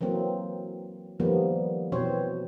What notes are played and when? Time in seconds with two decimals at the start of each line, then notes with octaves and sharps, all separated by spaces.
0.01 E3 F#3 A#3 C4
1.20 D#3 F3 G3 A#3 B3
1.92 B2 E3 C4 C5 C#5